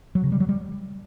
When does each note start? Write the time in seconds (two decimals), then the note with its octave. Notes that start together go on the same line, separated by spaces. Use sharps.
0.15 F#3
0.24 C#3
0.32 G3
0.40 F#3
0.49 G3